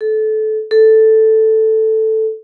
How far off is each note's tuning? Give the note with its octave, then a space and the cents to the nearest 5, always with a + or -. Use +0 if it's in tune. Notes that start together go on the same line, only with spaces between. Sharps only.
A4 -20
A4 +0